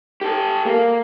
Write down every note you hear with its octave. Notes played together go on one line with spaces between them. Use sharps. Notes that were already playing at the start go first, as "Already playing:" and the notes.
G4 A4
A#3